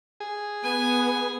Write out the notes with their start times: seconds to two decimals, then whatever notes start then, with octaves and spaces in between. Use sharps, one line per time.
0.20 G#4
0.64 B3 G#5